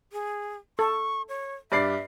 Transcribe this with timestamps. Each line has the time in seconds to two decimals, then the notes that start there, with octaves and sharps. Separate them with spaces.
0.12 G#4
0.79 A4 C#6
1.29 C#5
1.72 G2 D5 E5 C7